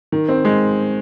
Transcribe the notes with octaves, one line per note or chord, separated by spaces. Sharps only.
D#3
C4
G#3